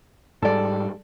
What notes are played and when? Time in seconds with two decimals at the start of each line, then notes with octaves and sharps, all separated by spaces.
0.42 G#2 G3 A4 D5